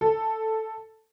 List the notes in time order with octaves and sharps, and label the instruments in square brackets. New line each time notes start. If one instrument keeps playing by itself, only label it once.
[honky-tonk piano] A4